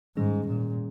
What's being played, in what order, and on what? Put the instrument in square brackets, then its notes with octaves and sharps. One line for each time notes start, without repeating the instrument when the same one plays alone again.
[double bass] G#2 [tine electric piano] D#3 G3 C#4 G#4
[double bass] A#2